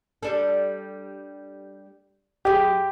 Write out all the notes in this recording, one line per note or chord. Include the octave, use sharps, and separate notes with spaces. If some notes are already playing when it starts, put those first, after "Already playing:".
G3 D4 A4
F#2 G4 G#4